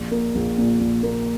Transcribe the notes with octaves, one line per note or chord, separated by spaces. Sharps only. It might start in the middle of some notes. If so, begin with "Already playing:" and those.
Already playing: A#1
A#3
A#1
A#2
A#1
A#3